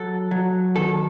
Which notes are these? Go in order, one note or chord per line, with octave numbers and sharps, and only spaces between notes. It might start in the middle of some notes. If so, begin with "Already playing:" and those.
Already playing: F#3 A4
F#3
D#3 A4